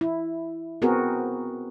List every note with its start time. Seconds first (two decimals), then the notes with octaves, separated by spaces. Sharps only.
0.01 E4
0.82 B3 C4 F#4 G#4 A#4